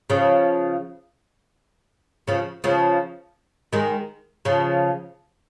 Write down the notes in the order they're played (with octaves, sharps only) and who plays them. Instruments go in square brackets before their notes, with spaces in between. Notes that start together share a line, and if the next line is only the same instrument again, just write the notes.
[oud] C#3 F3
C#3 F3
C#3 F3
D#3 G#3
C#3 F3